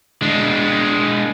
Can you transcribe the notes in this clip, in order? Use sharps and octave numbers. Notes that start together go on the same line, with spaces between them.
G#3 D4